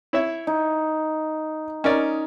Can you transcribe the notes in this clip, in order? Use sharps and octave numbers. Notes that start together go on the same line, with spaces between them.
E4 C#5 E5
D#4
C#4 D#4 A#4 D5